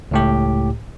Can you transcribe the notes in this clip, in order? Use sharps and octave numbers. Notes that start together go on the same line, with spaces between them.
C#2 A2 G4